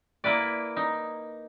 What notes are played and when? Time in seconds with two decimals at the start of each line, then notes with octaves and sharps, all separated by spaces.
0.24 A#3 E4 B4 D5
0.77 D#4